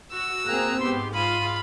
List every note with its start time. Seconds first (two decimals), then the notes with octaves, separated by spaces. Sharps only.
0.12 F#4 E6
0.46 A#3 C4 G#4 A#5 F#6
0.80 G#2 B3 G4 C6
1.15 G#3 F4 B5 D#7